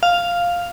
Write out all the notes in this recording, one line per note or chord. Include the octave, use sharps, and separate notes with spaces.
F5